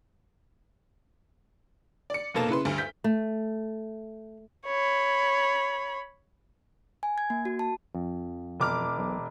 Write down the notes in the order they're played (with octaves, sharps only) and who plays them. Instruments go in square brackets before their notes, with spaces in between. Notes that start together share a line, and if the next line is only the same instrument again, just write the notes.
[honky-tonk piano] D5 C#7
F1 B2 A#3 A4 E7
C#3 E4 B4 C6
D2 G2
G6 B6
[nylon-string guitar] A3
[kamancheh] C#5 B5
[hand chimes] G#5
G#6
A#3
F#4
A5
[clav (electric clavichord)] F2
[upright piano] E1 D6 F6
[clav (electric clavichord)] B1